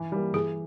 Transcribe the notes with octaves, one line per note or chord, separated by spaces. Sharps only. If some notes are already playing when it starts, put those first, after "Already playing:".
Already playing: E3
G3 A#3
E3 G#4